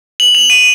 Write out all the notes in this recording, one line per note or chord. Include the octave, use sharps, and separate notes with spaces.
F#7
F7
D#7